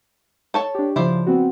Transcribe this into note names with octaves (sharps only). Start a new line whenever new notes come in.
A4 C#5 A5
D4 G4
C#3 F3 E4 C5 D5
B3 C4 F#4